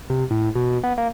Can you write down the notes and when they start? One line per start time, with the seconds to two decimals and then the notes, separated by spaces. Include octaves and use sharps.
0.10 C3
0.31 A2
0.55 B2
0.84 B3
0.98 A#3